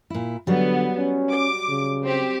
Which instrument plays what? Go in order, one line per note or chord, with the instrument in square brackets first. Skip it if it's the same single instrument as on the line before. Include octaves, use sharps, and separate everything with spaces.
[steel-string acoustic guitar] A#2 E4
[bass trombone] D3 [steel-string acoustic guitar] F#3 G3 [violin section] B3
[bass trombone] C#4
[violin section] D6
[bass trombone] C#3
[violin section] C4 G4